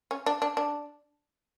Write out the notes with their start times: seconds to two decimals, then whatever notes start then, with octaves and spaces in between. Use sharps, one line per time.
0.11 C#4
0.26 D4
0.42 D4
0.57 D4